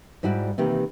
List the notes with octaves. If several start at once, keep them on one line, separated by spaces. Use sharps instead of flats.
G#2 G3 E4 F#4 D5
C3 D#3 E3 A#3 G4